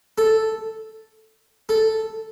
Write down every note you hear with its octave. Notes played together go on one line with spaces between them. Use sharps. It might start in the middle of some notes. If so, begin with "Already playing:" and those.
A4
A4